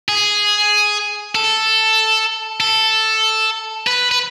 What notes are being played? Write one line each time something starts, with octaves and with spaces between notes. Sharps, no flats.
G#4
A4
A4
B4
B4